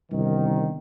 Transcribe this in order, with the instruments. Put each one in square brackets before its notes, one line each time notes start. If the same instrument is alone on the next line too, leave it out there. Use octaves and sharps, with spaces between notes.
[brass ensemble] G1 C2 D#3